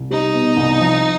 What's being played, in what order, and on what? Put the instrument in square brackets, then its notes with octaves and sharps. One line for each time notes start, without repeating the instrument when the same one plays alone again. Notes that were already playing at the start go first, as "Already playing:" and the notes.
Already playing: [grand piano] C2
[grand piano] G3 [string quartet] D#4
[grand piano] B2
C2
F3